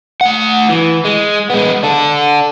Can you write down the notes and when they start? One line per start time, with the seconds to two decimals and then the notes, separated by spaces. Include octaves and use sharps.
0.21 A3 F#5
0.69 E3
1.05 G#3
1.50 G#3 B3
1.83 D4 A4